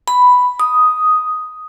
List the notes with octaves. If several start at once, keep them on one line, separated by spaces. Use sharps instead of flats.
B5
D#6